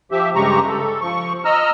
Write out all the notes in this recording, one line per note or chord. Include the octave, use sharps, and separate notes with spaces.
F3 G4 E5
G2 C#3 G#3 G4 A#5 C#6
A4
F3 C#6
D#5 A#5 E6 F6